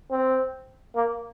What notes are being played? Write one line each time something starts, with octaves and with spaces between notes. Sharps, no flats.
C4
A#3